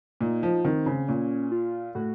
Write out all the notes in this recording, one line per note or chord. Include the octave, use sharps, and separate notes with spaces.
A#2 D#4
F3
D#3 C4
C#3
A#2 C#4
F4
A2 F#4